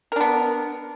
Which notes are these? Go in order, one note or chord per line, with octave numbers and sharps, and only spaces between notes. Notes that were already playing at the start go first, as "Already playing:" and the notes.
B3 D4 A#4